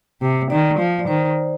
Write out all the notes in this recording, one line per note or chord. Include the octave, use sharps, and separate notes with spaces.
C3
D#3 D5
F3
D5
D#3 C5